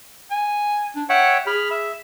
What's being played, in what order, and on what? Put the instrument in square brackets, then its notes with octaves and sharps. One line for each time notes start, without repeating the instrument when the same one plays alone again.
[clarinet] G#5
D4
[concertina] C#5 E5 G5 [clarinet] F#5
[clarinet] G#4 [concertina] B5 F6
[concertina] E5